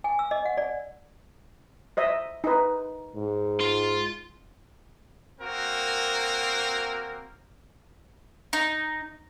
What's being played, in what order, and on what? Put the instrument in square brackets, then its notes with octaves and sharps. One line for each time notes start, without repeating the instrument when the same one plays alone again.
[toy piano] G#5
E6
D#5
F#5
D5
[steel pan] C5 D#5 E5
D#4 B4
[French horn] G#2
[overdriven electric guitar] F4 C6
[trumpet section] A#3 C4 F#4 A#4
[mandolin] D#4